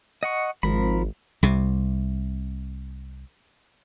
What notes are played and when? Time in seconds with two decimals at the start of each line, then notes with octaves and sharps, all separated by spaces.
0.23 D#5 F#5 C#6
0.63 G#1 F3 A#4 B5
1.43 C2 C3